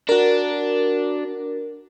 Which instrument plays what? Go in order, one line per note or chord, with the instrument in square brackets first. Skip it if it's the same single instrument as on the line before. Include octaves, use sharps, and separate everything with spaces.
[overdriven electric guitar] D4 [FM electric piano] F#4 A#4